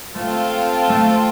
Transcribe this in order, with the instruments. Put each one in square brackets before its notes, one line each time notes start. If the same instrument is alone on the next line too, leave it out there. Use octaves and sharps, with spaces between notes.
[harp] A3 [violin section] C4 F4 A4
[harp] A3